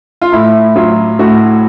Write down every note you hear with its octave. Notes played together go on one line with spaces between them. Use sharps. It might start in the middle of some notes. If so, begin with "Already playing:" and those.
F4
A2 E4
F#3 F4
A2 F#4